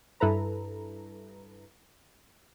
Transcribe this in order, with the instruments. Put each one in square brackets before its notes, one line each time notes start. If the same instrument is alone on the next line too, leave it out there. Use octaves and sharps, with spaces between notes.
[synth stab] G2 E4 A4 B4 A#5